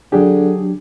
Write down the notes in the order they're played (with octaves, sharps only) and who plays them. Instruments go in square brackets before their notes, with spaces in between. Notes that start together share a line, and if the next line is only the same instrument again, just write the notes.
[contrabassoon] D3 [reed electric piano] F#3 D4 G4 [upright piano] G#4